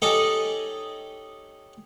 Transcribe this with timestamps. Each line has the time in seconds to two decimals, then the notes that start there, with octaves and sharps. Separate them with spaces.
0.02 C#4 D#4 G4 A4 D5 D#5